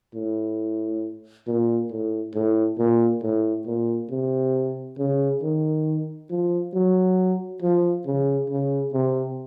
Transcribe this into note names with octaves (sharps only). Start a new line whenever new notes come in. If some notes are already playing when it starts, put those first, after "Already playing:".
A2
A#2
A2
A2
A#2
A2
A#2
C3
C#3
D#3
F3
F#3
F3
C#3
C#3
C3